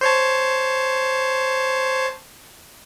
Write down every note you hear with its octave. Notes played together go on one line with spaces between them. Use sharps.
C5 C#5 A5